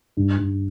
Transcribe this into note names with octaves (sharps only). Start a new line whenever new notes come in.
G2
G2